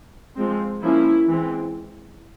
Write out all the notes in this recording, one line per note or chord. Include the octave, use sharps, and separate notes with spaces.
F3 G#3 C4
F3 A#3 C#4 E4
E3 G#3 C4